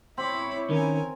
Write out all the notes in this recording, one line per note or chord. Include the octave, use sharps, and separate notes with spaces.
C4 E4 C#5 B5 D6
D#3 C#4 A#4 G#5